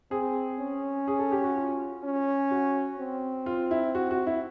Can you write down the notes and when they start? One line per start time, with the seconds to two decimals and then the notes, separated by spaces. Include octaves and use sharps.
0.11 C4 G#4
0.59 C#4
1.08 G#4
1.19 A4
1.32 G4
1.43 F#4
1.56 F4
2.04 C#4
2.51 F#4
2.99 C4
3.46 F4
3.71 E4
3.95 F#4
4.11 F#4
4.27 E4